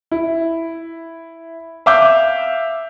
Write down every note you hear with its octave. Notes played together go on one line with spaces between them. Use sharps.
E4
E5 F5 D6 E6 G6